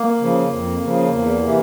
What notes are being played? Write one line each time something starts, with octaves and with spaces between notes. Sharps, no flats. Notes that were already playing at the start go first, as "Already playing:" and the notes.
Already playing: A#3
C#3 F3
F2
C#3 F3
E2
C3 E3